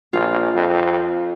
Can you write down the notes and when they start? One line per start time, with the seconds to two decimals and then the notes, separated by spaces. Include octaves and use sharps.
0.13 A#1 F4
0.55 F2